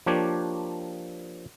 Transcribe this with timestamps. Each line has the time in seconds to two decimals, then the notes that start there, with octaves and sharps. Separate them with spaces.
0.06 F3 A#3 D4 G4 C#5